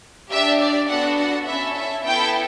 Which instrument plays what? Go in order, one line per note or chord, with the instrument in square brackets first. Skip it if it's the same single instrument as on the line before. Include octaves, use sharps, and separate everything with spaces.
[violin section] D4 G4 E5
D5
B3 D4 F#4 A4 F#5
F#5
C#4 E4 A4 E5
E5
B3 E4 A4 G5